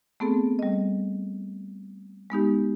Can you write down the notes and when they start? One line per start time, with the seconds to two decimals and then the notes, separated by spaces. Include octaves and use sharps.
0.20 A3 B3 C4 G#4 A4
0.59 G3 D#5
2.30 G#3 B3 D#4 G4